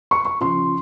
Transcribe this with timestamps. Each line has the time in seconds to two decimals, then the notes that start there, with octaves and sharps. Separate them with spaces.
0.11 C#6
0.25 C#6
0.41 C#3 F3 C6